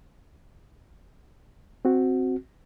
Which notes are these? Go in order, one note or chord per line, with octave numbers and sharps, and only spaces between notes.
C4 F#4